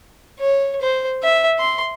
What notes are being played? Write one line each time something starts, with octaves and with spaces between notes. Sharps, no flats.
C#5
C5
E5
C6